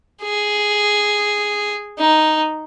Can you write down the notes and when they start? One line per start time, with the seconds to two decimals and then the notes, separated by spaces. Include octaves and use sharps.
0.23 G#4
1.98 D#4